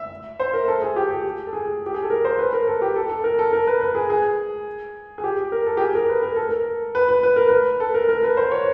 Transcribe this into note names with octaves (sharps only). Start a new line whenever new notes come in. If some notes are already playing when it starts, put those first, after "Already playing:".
Already playing: E5
C5
A#4
A4
G#4
G4
G4
A4
G#4
G4
G#4
A4
A#4
C5
B4
A#4
A4
G4
A4
A4
A#4
A4
A#4
B4
B4
G#4
G#4
G#4
G4
A#4
A4
G4
G#4
A#4
B4
A#4
A4
A#4
B4
B4
B4
A#4
B4
A4
A#4
A#4
B4
C5
C#5